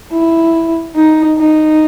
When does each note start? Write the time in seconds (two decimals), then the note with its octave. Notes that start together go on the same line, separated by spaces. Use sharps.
0.12 E4
0.95 D#4
1.38 D#4